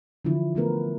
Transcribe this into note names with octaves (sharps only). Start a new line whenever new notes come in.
D3 E3 F3 E4
E3 F3 A3 B3 A#4 B4